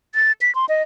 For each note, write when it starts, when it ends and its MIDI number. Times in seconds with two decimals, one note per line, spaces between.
0.15 0.32 93
0.41 0.53 95
0.55 0.66 84
0.69 0.83 75